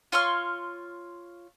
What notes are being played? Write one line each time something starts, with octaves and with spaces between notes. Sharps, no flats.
F4 C#5 C6 F6